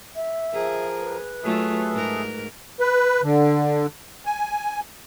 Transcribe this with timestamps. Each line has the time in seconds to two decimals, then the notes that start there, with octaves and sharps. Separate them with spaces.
0.15 E5
0.54 F3 G#4 A#4
1.01 B4
1.43 F#3 A3 F4 G#4 A4 E5
1.92 G#2 A#4
2.80 B4
3.23 D3
4.26 G#5